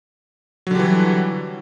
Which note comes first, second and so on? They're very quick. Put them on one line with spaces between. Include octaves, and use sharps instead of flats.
F#3 D3 G3 E3